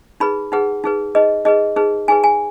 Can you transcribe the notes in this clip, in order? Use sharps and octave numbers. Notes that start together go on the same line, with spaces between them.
D#4 G#4 B4 B5
D#4 G#4 B4 F#5
D#4 G#4 B4
D#4 G#4 B4 D#5
D#4 G#4 B4 D#5
D#4 G#4 B4
D#4 G#4 B4 G#5
G#5